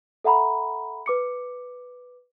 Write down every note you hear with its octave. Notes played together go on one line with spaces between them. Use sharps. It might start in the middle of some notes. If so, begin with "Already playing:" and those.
A4 E5 F#5 A#5 B5
B4 D6 C#7